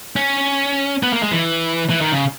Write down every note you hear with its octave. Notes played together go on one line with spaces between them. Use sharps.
C#4
B3
A#3
G#3
E3
E3
D#3
C#3